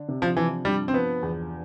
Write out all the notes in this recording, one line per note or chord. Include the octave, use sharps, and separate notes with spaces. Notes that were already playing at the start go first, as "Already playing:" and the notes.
Already playing: D3 D4
C3
F3
E3 F3
G2 G3
C4
F3 B3
E2